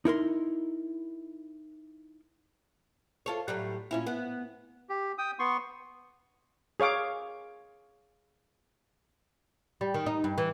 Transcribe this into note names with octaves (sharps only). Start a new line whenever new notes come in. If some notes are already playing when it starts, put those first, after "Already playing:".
D#4 E4 A#4 C6
F4 A4 C#5
A2 F#3 G3
A#2 C#4 E4
B3
G4
G5 D#6
B3 C6 C#6
G#4 C#5 F5 D6
G3
D#3
D#4
G2
E3